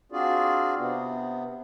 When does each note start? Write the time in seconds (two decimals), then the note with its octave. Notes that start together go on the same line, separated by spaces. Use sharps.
0.12 C4 D4 F4 F#4 G#4 D5
0.78 C3 B3